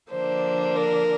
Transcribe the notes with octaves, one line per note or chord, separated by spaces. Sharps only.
D3 F3 A#3 D4 C5
A#4